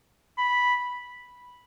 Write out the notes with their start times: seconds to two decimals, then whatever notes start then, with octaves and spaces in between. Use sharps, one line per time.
0.38 B5